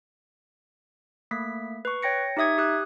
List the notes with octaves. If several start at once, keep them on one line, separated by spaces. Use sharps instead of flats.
A3 A#3 B6
B4 C#6
C#5 G5 A#6 C#7
D#4 G4 E5 D#6 G#6
G4 D#6 F#6